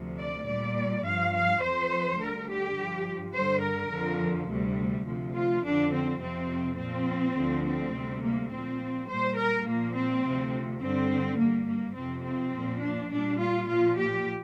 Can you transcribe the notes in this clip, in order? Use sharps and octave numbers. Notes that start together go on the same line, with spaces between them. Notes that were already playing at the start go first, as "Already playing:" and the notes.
Already playing: D2 C3 F3
D5
A#2 G3 D5
G2 F3 F5
F5
F2 F3 C5
D2 D3 G3 A#4
G4
G2 F3
G2 D3 G3 C5
A#4
F2 D3 F3
D2 C3 G3
D2 C3 F3
F4
F2 D3 F3 D4
C4
F2 C3 F3 C4
A#2 F3 C4
D2 D3 F3
C4
D2 C3 G3
A#3
A#2 F3 C4
A#2 G3 C5
A#4
A#2 F3 A#3
C4
D2 C3 F3
G2 D3 G3 C4
G2 G3 A#3
A#3
F2 C3 F3 C4
C4
A#2 F3
D4
A#2 G3 D4
F4
A#2 F3 F4
G4